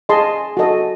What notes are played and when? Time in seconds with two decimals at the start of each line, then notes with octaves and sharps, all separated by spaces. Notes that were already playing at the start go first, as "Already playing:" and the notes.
0.09 G#4 D#5 A5 C6
0.57 F#4 A4 D#5